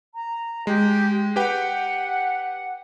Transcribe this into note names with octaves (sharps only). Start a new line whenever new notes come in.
A#5
G#3 G4
G4 B4 F#5 G5